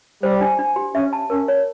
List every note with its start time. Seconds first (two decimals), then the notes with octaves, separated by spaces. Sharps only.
0.23 G3 C5
0.41 D4
0.59 D4
0.76 G4
0.94 C#4 E5
1.13 A5
1.30 C#4 A#4
1.48 C#5